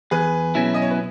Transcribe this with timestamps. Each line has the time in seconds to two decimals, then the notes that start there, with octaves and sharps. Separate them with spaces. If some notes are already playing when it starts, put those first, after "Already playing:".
0.11 E2 G#4 B4
0.55 B2 F#3 C#4 E4
0.74 D#5
0.82 C#5
0.90 B4